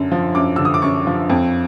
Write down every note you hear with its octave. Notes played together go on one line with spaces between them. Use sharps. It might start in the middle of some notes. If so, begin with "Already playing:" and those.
Already playing: F#2 D3
F3
F#2 D6
D3 E6
D#6
D6
F#2 C#6
F3
F2